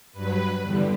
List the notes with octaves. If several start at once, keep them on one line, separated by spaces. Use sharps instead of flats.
G2 F#3 B4
E2 D3 G3